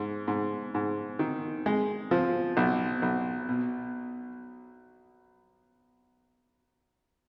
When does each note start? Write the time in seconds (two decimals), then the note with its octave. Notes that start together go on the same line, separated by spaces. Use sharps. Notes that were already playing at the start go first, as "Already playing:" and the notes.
Already playing: G#2
0.28 G#2
0.75 G#2
1.19 D#3
1.66 G#3
2.11 F3
2.57 B1
3.02 B1
3.49 B2